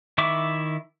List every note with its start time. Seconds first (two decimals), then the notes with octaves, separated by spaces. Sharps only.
0.18 D#3 E4 E5 C#6 D6